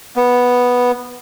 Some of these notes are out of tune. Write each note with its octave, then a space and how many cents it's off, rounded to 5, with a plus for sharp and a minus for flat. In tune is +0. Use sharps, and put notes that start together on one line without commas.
B3 -5